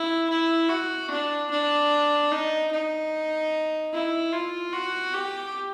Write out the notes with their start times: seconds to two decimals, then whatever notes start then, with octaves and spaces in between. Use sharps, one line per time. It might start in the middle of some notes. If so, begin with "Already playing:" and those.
Already playing: E4
0.29 E4
0.69 F#4
1.10 D4
1.50 D4
2.32 D#4
2.71 D#4
3.93 E4
4.32 F4
4.72 F#4
5.14 G4